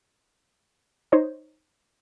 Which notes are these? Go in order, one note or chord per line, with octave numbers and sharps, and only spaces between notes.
D#4 C5 C#5 D#5